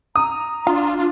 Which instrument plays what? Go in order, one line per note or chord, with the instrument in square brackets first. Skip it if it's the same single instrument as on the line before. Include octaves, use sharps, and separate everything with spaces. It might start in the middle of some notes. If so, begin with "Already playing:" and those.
[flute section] A#5 [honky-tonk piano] D#6
[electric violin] D4 [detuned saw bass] F4